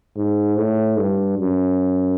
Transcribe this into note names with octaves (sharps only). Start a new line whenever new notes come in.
G#2
A2
G2
F#2